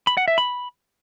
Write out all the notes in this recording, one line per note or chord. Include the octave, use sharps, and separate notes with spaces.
B5
F#5
E5
B5